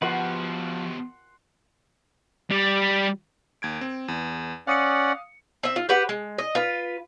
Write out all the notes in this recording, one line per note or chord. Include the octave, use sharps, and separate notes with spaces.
F3 B3 F#4 G4 B4 F#5 C6
G3
D#2 G#6 D7
C4
E2
C#4 D5 F5 F#5 D#6 C#7
C4 E5
F4
G4 B4 F#5
G#3
D#5
F4 B4